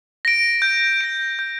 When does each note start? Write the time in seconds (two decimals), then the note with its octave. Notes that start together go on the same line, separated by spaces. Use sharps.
0.25 A#6 D7
0.62 G6
1.01 A#6 D7
1.39 G6